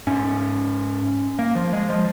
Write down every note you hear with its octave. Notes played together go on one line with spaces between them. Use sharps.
G#2 C#4
A#3
F3
G#3
F3